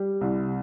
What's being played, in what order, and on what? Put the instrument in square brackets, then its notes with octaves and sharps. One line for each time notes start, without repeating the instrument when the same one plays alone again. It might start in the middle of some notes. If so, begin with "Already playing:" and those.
Already playing: [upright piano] G3
C2